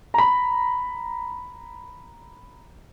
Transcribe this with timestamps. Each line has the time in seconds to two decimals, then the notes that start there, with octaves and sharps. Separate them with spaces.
0.14 A#5 B5